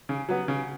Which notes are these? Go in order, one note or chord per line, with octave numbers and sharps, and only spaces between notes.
C#3
F#3 B3
C#3